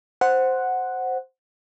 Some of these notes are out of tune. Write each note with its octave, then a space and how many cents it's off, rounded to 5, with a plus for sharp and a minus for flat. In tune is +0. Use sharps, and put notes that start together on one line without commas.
C5 +0 F#5 +0